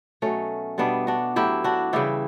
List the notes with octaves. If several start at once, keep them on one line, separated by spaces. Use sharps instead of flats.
B2 F#3 A3 C#4
B2 G3 B3 D4
D4 F#4
A2 F#3 E4 G4
D4 F#4
C#3 E3 G3 E4 G4